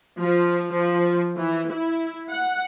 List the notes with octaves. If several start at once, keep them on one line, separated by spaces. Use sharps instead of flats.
F3
F3
E3
E4
F#5